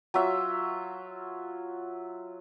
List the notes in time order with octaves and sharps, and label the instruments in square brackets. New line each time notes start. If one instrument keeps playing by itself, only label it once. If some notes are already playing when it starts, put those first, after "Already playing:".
[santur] F#3 F4 E5